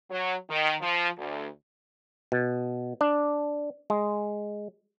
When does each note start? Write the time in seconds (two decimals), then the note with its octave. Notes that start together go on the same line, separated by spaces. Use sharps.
0.11 F#3
0.50 D#3
0.81 F3
1.18 D2
2.32 B2
3.01 D4
3.90 G#3